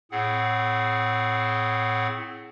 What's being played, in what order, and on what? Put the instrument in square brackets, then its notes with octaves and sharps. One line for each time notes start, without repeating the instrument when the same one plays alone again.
[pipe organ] A2 C4 G#4 F#5